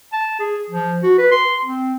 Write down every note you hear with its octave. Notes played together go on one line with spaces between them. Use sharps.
A5
G#4
F3
F#4
B4
C6
C4